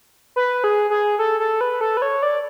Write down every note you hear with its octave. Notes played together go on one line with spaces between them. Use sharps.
B4
G#4
G#4
A4
A4
B4
A4
B4
C#5
D5